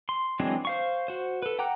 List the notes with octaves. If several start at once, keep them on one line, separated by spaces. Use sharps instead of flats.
C6
E3 F#3 G#3 C4 D4
C5 F5 C#6
F#4 C5
A4 B4
F#5 G5 A#5 D6 F#6